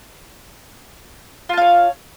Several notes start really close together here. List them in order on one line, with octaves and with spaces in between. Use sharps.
F4 A5 F5 C#5